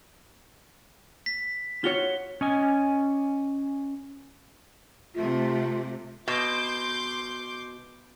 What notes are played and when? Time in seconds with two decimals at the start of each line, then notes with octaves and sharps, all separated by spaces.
1.26 B6
1.84 F4 F#4 C#5 G7
2.41 C#4 D#5 G#5
5.15 C3 A3 F4
6.28 B2 C6 D6 G6